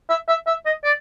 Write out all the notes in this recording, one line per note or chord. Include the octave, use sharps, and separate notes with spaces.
E5
E5
E5
D#5
D5